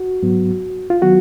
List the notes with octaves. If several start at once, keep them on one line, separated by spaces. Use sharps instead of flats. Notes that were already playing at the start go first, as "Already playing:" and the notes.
Already playing: F#4
G#2 F#3 B3
F4
D#3 F#3 B3 F#4